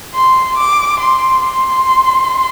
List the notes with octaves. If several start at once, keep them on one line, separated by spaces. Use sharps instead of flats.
C6
D6
C6
C6